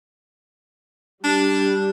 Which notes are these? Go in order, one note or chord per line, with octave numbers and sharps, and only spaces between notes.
G3 D4